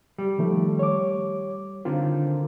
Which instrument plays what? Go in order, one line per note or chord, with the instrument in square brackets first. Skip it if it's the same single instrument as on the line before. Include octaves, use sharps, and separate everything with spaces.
[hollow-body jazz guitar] G3
[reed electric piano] D#3 F3 A3
C#5 D6
[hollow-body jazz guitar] D3 D#3 C4 [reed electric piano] F4